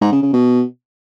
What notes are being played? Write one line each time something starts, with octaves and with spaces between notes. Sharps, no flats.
G#2
C#3
C#3
B2